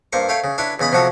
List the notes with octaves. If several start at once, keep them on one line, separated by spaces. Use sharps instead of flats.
G2 A#3 C5 C#6
A3 C#5 F5 G5
C#3
D4 E4 B4 C#5
E2 C#3 D#5 B5 D#6
C3 F3 F#3 F#4 A4 C#5